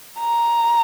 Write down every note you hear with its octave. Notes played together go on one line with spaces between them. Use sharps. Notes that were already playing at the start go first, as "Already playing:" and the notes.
A#5